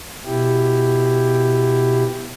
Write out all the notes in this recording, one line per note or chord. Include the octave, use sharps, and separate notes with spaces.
B2 E4 G4